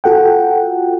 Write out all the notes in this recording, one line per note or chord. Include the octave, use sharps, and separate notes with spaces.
F4 F#4 A4 F#5 G5